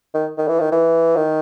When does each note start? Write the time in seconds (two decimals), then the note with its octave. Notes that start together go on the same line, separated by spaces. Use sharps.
0.14 D#3
0.37 D#3
0.48 E3
0.60 D#3
0.72 E3
1.16 D#3